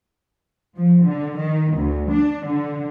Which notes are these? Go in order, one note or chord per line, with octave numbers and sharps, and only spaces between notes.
F3
D3
D#3
D2
D4
D3